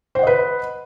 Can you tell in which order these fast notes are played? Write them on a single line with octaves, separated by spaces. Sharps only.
C5 F#5 D#5 B4